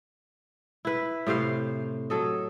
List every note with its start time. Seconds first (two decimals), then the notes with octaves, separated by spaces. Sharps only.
0.85 E4 B4
1.27 A2 C3 C5 F5
2.10 F#3 A4 D#5